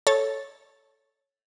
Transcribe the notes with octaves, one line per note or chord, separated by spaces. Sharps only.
A4 C#5 A6